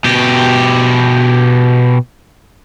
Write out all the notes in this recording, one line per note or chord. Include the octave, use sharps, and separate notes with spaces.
B2 G4